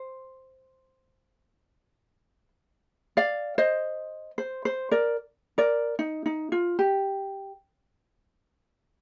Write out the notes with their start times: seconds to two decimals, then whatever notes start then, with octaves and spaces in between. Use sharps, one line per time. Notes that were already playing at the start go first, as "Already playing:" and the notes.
Already playing: C5
3.17 D5 F5
3.58 C5 D#5
4.38 C5
4.65 C5
4.91 A#4 D5
5.58 A#4 D5
5.99 D#4
6.26 D#4
6.52 F4
6.79 G4